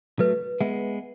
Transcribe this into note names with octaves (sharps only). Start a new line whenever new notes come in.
F#3 A3 B4
G#3 B3 E5